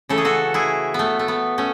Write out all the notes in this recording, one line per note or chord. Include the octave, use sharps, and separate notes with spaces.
C#3 E3 A3 A4
G#4
F#4 A4
E4 G#4
A3 B3
A3
B3
A3 C#4